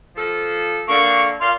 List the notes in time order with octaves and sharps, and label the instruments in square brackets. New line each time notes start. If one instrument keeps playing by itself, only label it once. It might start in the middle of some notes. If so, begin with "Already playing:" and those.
[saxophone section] F3 A4
[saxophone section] D3 A#3 [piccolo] C#6
[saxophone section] A#2 D5 F5 [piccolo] C6